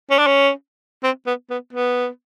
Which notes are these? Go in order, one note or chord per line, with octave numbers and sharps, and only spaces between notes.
C#4
D4
C#4
C4
B3
B3
B3